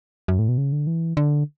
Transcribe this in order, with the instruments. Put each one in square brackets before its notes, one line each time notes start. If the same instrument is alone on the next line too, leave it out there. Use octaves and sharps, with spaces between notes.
[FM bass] F#2
A2
B2
C#3
D3
E3
D3